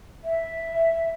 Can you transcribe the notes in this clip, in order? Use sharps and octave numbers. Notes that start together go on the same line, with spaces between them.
E5